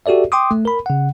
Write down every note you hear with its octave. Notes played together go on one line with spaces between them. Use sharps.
F#4 G4 A4 D5 E5
G5 C6 D6 D#6
A3
A#4 B5
C#3 F#5